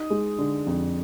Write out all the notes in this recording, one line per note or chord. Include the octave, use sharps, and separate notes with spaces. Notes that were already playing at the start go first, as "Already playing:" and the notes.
Already playing: D#4 D#6
G#3
D3
F2